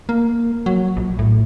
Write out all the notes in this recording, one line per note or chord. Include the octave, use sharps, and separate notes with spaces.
A#3
F#3
A#1
A2